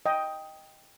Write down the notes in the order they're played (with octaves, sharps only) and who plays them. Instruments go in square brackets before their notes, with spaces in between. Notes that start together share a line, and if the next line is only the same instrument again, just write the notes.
[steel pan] D#5 G5